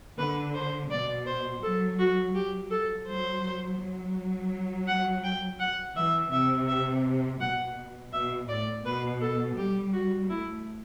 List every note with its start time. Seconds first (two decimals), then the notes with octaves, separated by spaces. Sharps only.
0.18 D3 B4
0.54 C5
0.91 B2 D5
1.26 C5
1.63 F#3 A4
1.99 F#4
2.35 F#3 G4
2.71 A4
3.07 F#3 C5
3.79 F#3
4.88 F#5
5.24 G5
5.60 F#5
5.96 E3 E5
6.32 C3 E5
6.68 E5
7.41 B2 F#5
8.13 B2 E5
8.49 A2 D5
8.85 B2 B4
9.21 A4
9.57 G3 G4
9.93 F#4
10.29 A3 E4